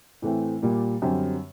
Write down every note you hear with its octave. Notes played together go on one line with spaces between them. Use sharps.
A2 E3 A3 C4
A#2 G3 A#3
F#2 D3 G3 C4